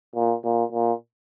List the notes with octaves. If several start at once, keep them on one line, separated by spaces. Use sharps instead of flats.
A#2
A#2
A#2